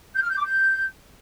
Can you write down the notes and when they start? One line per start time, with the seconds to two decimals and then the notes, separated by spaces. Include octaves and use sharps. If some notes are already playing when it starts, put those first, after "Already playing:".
0.15 G6
0.22 F6
0.30 G6
0.37 D6
0.45 G6